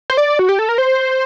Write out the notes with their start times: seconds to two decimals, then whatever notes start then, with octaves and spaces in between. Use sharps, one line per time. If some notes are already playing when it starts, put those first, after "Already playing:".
0.10 C5
0.17 D5
0.39 F#4
0.49 G4
0.59 A4
0.69 A#4
0.78 C5